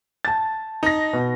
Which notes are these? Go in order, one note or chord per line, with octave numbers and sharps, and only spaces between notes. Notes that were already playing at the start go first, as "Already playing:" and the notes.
A5 A6
D#4 A#6
B2